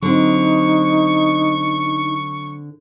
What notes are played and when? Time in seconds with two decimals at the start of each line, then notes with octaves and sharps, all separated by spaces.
0.03 D3 F#3 C4 D#4 C#6